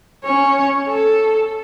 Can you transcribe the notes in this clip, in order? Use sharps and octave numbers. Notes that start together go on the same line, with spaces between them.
C#4 C#5
A4